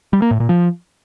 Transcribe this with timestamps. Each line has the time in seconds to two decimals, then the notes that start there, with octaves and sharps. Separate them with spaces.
0.13 G3
0.22 A#3
0.31 A2
0.40 A#2
0.49 F3